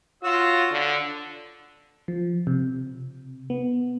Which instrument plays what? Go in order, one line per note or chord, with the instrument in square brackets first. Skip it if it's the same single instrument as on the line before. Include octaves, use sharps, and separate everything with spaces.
[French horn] F4 [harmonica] F#4 C#5 E6
[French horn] D3
[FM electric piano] F3
C3
B3